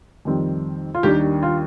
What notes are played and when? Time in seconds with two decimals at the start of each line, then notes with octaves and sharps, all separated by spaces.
0.25 F2 D#3 G3 C4
0.95 F4
1.03 D#2 D#3 G3 D4 G4
1.43 F4